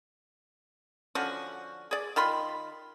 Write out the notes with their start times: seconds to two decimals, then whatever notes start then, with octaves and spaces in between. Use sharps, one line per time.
1.15 D3 F3 C#4 F#4
1.91 G#4 D5
2.16 D#3 F4 B5 C6